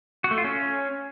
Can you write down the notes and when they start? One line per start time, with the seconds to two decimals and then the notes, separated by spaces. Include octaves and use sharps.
0.24 F#4
0.31 A3
0.38 F4
0.44 C#4